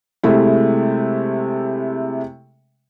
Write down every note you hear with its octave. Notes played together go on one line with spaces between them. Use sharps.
C3 G#3 A3 E4